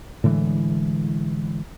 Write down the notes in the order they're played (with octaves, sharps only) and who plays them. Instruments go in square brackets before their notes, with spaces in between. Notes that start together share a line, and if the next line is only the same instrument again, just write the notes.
[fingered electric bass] A2 D3 E3 G#3